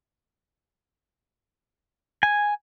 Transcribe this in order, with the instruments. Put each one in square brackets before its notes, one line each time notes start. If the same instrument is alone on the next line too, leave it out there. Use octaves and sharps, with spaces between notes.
[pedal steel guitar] G#5